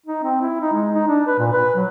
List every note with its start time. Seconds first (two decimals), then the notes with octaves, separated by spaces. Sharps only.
0.06 D#4
0.24 C4
0.42 E4
0.61 D#4
0.73 G#3
0.94 D#4
1.07 D4
1.27 B4
1.39 A#2
1.53 B4
1.75 F#3